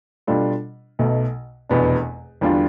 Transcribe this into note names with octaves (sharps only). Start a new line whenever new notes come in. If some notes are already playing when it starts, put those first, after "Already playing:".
B2 G3 D4 F4 A4
B1 B2 A3
F1 E2 B2 B3 D4
E2 D3 G3 D4 F4